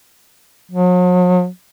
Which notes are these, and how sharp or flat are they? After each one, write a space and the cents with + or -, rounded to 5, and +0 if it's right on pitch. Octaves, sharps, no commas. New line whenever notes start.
F#3 -45